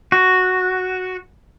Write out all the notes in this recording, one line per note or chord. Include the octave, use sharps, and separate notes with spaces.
F#4